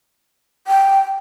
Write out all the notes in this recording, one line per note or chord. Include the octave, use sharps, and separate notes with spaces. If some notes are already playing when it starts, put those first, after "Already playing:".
G5